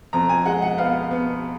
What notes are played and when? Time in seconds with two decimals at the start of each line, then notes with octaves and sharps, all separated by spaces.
0.13 F2 A#5
0.29 G#5
0.45 G#3 F#5
0.62 F#5
0.78 B3 F5
1.11 B3